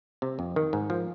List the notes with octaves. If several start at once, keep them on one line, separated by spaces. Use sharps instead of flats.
C3
F2
D#3
G#2
F3